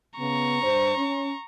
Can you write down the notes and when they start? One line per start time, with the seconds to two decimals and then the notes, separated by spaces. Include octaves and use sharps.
0.18 C#3 B3 A#5 C#6
0.62 G2 C5
0.97 C#4